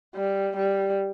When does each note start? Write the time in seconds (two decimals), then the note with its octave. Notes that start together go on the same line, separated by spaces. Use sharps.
0.15 G3
0.56 G3